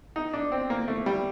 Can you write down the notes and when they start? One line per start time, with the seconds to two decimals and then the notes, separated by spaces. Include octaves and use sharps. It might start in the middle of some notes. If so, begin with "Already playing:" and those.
0.16 D#4
0.33 D4
0.52 C4
0.70 A#3
0.88 A3
1.06 G3